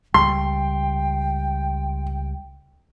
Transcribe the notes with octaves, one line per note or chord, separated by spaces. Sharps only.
C#2 G3 G5 C6